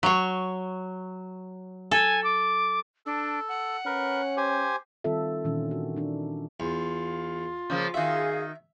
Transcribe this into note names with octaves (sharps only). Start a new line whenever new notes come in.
F#3 C#5
A4 G#5
D6
D4 A4
F#5
C#4 A#4 B4
G4 C5 G#5
D#3 G3 C4 F4 A4 E5
A#2 D#3 E3 C#4 D4
F#4
D4 D#4
E2 F4
C#3 F3 A#3
D#3 F#4 G#4 E5 F5